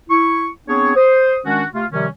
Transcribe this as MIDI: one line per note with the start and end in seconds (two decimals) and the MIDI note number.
0.09 0.47 64
0.09 0.47 85
0.68 0.95 59
0.68 0.95 60
0.68 0.95 62
0.68 0.95 68
0.68 0.95 73
0.96 1.39 72
0.96 1.39 87
1.46 1.65 51
1.46 1.65 56
1.46 1.65 61
1.46 1.65 62
1.46 1.65 66
1.74 1.85 48
1.74 1.85 57
1.74 1.85 65
1.92 2.07 48
1.92 2.07 51
1.92 2.07 53
1.92 2.07 55
1.92 2.07 61